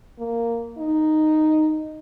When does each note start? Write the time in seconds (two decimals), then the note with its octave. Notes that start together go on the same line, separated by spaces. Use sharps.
0.19 A#3
0.78 D#4